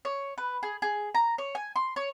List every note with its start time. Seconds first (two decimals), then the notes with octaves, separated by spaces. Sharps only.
0.05 C#5
0.38 B4
0.63 G#4
0.82 G#4
1.15 A#5
1.38 C#5
1.55 G#5
1.76 C6
1.96 C#5